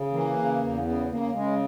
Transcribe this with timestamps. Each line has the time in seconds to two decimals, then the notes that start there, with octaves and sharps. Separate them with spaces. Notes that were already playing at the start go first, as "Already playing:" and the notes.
Already playing: C#3
0.11 E3 A#3
0.37 C#3
0.61 E2
0.84 C#3 B3
1.08 C#3 A#3
1.33 C#3 G#3